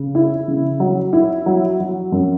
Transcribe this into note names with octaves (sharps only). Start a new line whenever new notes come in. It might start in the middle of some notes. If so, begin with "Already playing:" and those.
Already playing: C#3
E4
C#3
F#3
E4
F#3
F#3
F#2